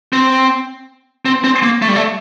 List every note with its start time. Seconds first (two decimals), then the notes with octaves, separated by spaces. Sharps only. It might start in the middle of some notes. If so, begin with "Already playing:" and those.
0.13 C4
1.26 C4
1.44 C4
1.63 A#3
1.82 A3
1.89 G3
1.96 A3